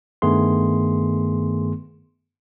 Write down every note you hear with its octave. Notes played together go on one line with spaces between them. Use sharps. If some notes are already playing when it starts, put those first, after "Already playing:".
G2 D#3 A3 B3 G#4 C6